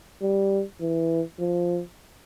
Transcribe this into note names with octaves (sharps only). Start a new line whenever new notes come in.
G3
E3
F3